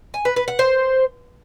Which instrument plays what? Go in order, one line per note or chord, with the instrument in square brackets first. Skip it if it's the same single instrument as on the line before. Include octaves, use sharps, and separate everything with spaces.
[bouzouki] G#5
B4
B4
F#5
C5